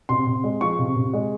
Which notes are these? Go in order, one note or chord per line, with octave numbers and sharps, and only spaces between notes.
C3 C6
C3
G#3
F3 C#6
C3
C3
G#3